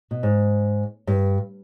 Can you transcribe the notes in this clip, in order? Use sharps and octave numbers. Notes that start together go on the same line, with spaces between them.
B2
G#2
G2